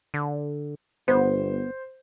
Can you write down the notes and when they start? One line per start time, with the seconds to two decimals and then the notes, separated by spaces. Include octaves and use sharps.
0.14 D3
1.08 G1 B3 C5